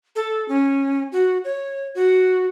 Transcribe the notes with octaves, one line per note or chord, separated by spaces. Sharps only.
A4
C#4
F#4
C#5
F#4